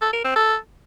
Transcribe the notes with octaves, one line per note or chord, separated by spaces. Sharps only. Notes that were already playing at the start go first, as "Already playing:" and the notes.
A4
A#4
C4
A4